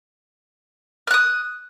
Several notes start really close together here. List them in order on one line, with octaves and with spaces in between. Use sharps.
F6 F#6 D#6